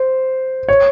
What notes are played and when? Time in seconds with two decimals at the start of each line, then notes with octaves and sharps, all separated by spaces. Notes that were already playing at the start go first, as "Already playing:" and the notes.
Already playing: C5
0.68 C#5